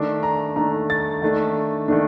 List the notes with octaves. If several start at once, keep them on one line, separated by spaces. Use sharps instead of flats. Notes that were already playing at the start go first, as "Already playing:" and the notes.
Already playing: D#3 A3 D4 D6
A#5
D#3 A3 D4 A#5
A6
D#3 A3 D4
D#3 A3 D4